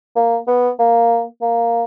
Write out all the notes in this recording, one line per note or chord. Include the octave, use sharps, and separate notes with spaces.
A#3
B3
A#3
A#3